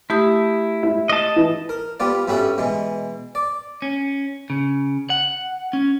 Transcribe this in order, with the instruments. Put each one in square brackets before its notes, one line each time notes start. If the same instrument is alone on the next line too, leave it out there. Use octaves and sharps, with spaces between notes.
[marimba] A3 G4 D#6 [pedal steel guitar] E4
[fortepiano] E4
[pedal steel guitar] D#5 A5
[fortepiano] E3
[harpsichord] A#4
G3 B3 F4 D5
G2 G3 C#4 F#4 A4 E5
B2 E3 G#3
D5
[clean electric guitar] C#4
C#3
F#5
C#4